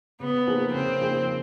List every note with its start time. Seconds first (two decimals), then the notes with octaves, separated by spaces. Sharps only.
0.20 C#3 B3
0.47 F3 A#3 D#4 G#4
0.73 C#3 C4
1.01 F3 A#3 D#4 G#4